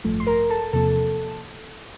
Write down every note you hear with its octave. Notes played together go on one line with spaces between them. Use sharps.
A1 G2 F3 A3
C6
A#4 A#5
A4 A5
E2 C3 F3 A#3 A4 A5